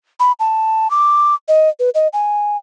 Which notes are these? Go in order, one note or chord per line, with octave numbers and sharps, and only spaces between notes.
B5
A5
D6
D#5
B4
D#5
G#5